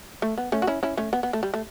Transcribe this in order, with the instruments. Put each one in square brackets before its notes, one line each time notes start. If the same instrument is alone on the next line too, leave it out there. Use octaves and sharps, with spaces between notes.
[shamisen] A3
B3
A3 C#4
F#4
C#4 E4
C#4 E4
A3 C#4
B3
B3
A3
G3
A3